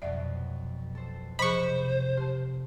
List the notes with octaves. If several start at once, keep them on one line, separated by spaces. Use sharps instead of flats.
F2 B2 F#3 D5 E5 F#5
A4 C5
C3 F3 G#4 C5 B5 C#6
G4 A5 C6